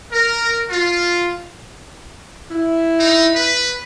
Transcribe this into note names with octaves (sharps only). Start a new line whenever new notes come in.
A#4
F4
E4
D#4
B4